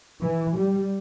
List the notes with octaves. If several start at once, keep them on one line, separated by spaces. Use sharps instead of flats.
E3
G3